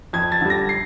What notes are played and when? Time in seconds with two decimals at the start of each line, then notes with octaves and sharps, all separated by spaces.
0.13 F2 G#6
0.32 A6
0.41 D3 G3
0.50 A#6
0.69 C7